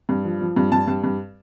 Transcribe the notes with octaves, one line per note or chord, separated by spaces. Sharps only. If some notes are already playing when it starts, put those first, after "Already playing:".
G2
F3
F3
G2
G2 A5
G2
G2